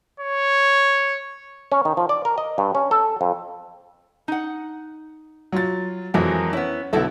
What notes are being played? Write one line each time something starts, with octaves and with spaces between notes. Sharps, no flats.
C#5
C#4
D#3
F3
D5
A#4
D#5
G2
C#4
A4
F2
D#4 F#5
F#3 F4 A6
F2 E3 F#3 G#3 E4 A#4
B3 C#4 E4
B1 D3 B3 E4 A4